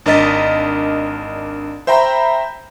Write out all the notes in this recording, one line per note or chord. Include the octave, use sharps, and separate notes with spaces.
G#1 D4 A#4 D#5 A6 B6
C5 E5 G5 A#5 B5